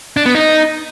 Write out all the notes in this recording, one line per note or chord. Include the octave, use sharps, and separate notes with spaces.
D4
B3
D#4